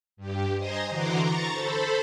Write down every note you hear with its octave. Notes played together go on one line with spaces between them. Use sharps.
G2 G4
C5 D#5 G#5 A#5 C6 D#6
D3 E3 F#4 A#5 C6 D6
A#5 C#6 A6
A4 C5 B5